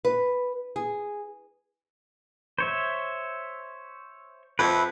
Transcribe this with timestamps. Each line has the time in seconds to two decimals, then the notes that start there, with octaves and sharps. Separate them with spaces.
0.05 B4
0.76 G#4
2.58 C5 C#5 E5
4.59 F2 B4 E5